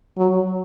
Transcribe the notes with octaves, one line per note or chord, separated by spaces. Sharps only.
F#3